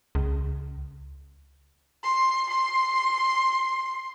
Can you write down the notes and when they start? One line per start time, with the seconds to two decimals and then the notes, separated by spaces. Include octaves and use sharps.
0.15 C#2
2.03 C6
2.49 C6